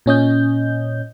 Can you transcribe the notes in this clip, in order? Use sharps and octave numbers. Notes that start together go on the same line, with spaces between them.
A#2 C#4 D#5 G6